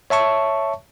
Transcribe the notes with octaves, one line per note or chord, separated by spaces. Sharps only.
C#5 E5 A5 C#6